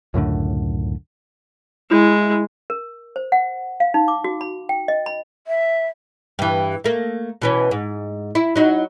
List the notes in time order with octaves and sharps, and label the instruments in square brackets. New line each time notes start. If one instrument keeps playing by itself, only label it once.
[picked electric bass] C#2 F#2 A2 D3
[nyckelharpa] G#3 [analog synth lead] E4
[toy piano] A#4
C5
F#5
F5
D#4
D6
F#4
B5
G5
D#5
B5
[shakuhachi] E5
[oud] G2 E3
A3 A#3
B2 E3 C#4
G#2
E4
F#3 D#4 F#4